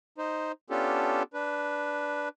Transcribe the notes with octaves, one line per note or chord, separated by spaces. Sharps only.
D#4 C5
B3 C#4 D4 F4 G4 A4
D4 B4